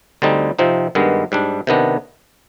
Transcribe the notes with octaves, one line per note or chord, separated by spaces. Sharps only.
D2 D3 G3 C4 D#4
C3 F3 C4 D#4
G2 D#3 G#3 B3
G#2 G3 D4
C3 D#3 B3 D4